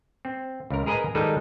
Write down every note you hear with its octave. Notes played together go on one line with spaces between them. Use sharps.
C4
C#2 A#4
G#4 A#4 B4 D#5 G#5 A#5
D#3 G3 G#3 D#4 A4 B4